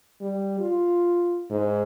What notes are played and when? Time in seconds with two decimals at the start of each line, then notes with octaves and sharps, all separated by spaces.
0.21 G3
0.60 F4
1.50 G#2